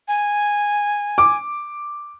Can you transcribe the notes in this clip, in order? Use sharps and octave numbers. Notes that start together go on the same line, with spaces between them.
G#5
D6